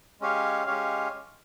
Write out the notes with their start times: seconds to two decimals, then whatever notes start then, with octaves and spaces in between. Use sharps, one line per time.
0.20 G#3 C#4 G4 C#5 F5
0.66 G#3 C#4 G4 C#5 F5